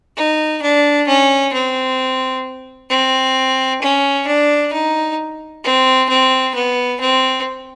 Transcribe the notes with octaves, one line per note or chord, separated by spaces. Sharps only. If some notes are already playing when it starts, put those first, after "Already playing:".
D#4
D4
C#4
C4
C4
C#4
D4
D#4
C4
C4
B3
C4